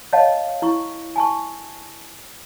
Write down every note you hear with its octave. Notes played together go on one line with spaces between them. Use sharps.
C#5 D#5 F5 F#5 A5
E4 C#6
G#5 A5 C#6